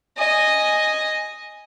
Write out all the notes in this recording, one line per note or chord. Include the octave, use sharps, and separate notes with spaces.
D#5 G#5